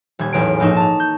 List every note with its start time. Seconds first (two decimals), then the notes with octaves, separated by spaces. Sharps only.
0.19 D#1 G3 G#6
0.33 A1 E2 F#3 G#4 D7
0.60 A#1 G#2 D#4 C#6 E7
0.76 A5 A#5
1.00 G6